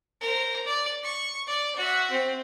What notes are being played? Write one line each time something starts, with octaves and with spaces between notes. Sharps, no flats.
A#4 C5
D5
C#6
D5
F#4 E5
C4